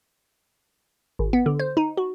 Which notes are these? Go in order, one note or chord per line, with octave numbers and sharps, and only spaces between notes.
G#1
B3
D3
C5
D#4
F#4